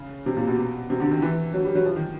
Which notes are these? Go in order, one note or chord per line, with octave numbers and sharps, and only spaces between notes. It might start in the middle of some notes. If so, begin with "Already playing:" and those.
Already playing: C#3
C3
A#2
B2
C3
D3
D#3
E3
F#3
G3
F#3
F3
D#3